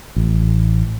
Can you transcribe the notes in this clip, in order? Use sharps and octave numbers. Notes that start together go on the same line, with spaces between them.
A1